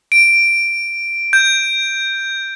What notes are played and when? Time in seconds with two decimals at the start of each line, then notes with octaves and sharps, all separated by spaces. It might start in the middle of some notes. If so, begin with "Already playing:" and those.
0.12 D7
1.33 G6